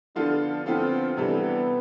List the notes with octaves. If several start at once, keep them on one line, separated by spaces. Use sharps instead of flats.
D3 F3 B3 D4 F4 A4
D3 F3 B3 C4 F4 A4
C3 E3 G3 B3 D4 A4